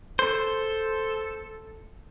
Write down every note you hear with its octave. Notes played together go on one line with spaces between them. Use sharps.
A4 C5